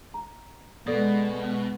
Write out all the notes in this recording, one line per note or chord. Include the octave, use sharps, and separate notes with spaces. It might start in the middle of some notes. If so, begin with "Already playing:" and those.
A#5
B2 G#3 B3 A4 D5 D#6